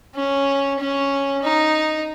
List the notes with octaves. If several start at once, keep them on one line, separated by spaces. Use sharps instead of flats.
C#4
C#4
D#4